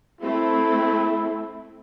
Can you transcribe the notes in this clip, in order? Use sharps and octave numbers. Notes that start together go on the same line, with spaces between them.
A3 C4 E4